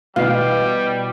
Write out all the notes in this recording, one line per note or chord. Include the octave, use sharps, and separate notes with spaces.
B2 E3 G3 B4 D#5 F5